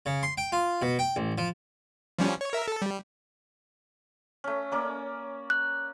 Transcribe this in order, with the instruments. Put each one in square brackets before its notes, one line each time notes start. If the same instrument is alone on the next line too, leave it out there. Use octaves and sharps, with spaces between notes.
[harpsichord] C#3
C6
G5
F4
B2
G5
A1
F3
[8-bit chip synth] F3 G3 C#4
C#5
A#4 E5
A4
G3
[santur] A3 C#4
A#3 C#4 D5
[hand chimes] F#6